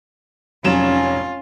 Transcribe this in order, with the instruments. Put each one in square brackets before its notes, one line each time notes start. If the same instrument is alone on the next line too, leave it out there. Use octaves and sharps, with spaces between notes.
[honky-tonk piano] F1 F#3 E7 [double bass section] C#4 [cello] F4